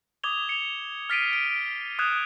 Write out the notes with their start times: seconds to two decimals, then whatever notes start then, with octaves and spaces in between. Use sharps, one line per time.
0.23 D6 D#6 G#6 F7 G7
0.49 C#7 F7
1.10 F6 A6 B6 C7 D7 D#7
1.31 F6 B6 D7 D#7
1.99 D#6 F6 F#6 G#6 E7